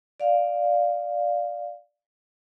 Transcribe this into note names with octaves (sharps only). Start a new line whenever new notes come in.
D5 F5